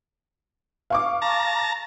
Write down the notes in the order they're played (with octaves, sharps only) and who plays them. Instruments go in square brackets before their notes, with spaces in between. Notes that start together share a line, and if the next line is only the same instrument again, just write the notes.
[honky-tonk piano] F5 C#6 D6
[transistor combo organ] A5 A#5